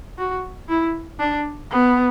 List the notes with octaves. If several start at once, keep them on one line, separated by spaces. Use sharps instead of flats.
F#4
E4
D4
B3